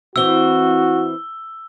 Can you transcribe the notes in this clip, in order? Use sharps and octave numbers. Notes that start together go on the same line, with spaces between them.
E3 C4 E4 F#4 E6 G7